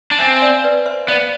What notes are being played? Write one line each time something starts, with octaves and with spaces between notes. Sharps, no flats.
D4 A5
C4 E5 G#5
G#5
D5 F5
B4 D5
C5 E5
B3 D5 F5